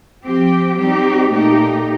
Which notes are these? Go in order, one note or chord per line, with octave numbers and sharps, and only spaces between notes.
F3 C4 G4
G3 C4 D#4 G4
A#2 A3 D#4 G4